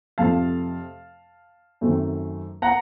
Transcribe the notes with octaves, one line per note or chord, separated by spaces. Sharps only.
F2 C3 F3 A3 C4 F5 A5
F#2 D#3 F#3 A3 C4
F#5 A#5